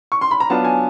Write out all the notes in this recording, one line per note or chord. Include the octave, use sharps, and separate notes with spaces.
C#6
C6
B5
A#5
F#3 B3 D4 F4 A5
G#5